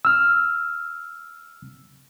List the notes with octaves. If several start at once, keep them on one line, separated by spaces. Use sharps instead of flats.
E6 F6